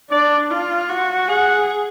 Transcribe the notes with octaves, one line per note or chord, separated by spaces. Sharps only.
D4 D5
F4
F#4
G#4 F#5